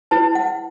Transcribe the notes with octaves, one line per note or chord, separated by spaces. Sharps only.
E4 B4 A5
F#5